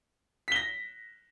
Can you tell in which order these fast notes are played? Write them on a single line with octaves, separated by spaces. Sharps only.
B6 G7 A#6